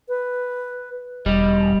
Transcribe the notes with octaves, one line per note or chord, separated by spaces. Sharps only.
B4
E1 G3 D#5